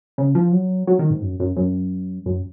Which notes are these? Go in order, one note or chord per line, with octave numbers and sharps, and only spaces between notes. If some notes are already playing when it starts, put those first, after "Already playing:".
C#3
F3
F#3
F#3
D#3
G#2
F#2
F#2
F#2
F#2